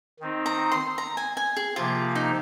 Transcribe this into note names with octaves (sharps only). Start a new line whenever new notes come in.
D#3 C4 D#4
A#5
C6
A#5
G#5
G#5
G#4
C3 F3 A#3 F4
D#4